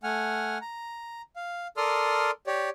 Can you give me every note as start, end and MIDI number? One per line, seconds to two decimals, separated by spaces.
0.03 0.58 57
0.03 0.58 78
0.03 0.58 80
0.03 0.58 89
0.61 1.22 82
1.36 1.67 77
1.77 2.31 69
1.77 2.31 70
1.77 2.31 74
1.77 2.31 84
1.77 2.31 87
1.77 2.31 89
2.47 2.70 67
2.47 2.70 73
2.47 2.70 74